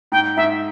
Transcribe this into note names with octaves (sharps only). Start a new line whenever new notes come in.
G#2 G5
G#2 E5